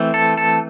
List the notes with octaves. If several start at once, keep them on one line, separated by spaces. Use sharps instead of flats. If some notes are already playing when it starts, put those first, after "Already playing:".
Already playing: E3 A3 C4
A4
A4